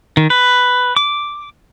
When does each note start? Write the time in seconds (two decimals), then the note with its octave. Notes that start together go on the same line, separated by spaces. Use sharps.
0.17 D#3
0.30 B4
0.96 D6